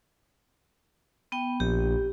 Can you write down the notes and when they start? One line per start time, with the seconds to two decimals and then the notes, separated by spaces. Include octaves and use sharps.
1.32 B3 G5
1.60 A#1 G4